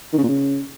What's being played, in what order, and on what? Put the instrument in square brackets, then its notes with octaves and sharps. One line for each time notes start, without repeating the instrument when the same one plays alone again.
[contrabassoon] D#3
C#3
A#2
C#3